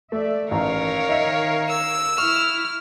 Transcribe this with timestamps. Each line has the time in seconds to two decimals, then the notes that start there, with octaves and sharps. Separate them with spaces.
0.12 A3 D5 E5
0.51 A1 D#3 A#4 C#5 F5 A#5
1.09 D#4 D#5 E5
1.69 E6
2.18 E4 C#6 F6